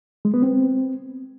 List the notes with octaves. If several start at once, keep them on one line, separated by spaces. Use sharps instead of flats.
G#3
B3
C4